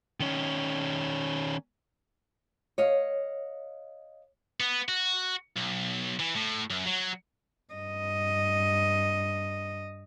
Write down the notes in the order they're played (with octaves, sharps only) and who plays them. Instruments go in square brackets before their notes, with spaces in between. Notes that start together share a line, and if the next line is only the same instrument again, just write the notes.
[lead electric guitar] D#3 C#4
[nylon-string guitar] C#5 D#5 F5
[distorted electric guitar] B3
F#4
B1
E3
A2
F#2
F#3
[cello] G2 D#5